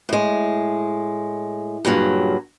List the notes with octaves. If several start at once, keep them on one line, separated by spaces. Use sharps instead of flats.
A2 G#3
G2 A#2 C#3 F#3